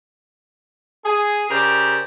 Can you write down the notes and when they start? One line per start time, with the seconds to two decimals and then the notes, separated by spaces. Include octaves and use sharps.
1.06 G#4
1.50 C#3 G4 A#4 C5 D5